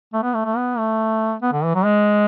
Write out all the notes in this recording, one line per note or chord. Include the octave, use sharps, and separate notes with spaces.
A3
B3
A3
A3
B3
A3
B3
D3
E3
F#3
G#3